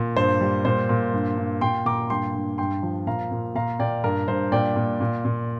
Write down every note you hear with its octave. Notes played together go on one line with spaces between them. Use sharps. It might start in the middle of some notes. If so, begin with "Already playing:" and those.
Already playing: A#2
G2 C5
G3
A#2 C5
A#2
G2
G2
A#2 G5 C6
A#2 A#5 D6
G2 G5 C6
G2
G2 G5 C6
F3
A#2 F5 A#5
A#2
A#2 F5 A#5
A#2 D5 G5
G2 A#4
G2 C5
A#2 D5 G5
A#2
A#2
A#2